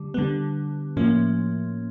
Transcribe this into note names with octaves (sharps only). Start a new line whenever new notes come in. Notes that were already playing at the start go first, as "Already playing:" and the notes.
Already playing: D3 G3
D3 G3 B3
A2 F3 A#3 C#4